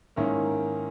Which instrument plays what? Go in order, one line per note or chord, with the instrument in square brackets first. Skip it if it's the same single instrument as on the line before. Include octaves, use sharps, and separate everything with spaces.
[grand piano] G#2 D#3 A#3 C#4 E4